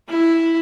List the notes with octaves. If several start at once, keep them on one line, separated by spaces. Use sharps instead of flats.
E4